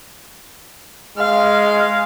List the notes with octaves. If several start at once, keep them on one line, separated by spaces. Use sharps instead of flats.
G#3 F5